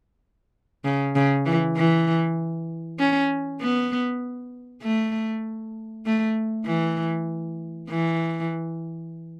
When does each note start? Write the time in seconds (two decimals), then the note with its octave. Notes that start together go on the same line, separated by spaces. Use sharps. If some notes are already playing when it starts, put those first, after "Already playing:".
0.85 C#3
1.16 C#3
1.46 E3
1.76 E3
2.99 C#4
3.61 B3
4.83 A3
6.06 A3
6.66 E3
7.89 E3